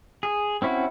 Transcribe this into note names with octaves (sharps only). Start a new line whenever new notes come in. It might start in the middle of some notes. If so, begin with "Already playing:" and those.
G#4
C4 C#4 E4 F#4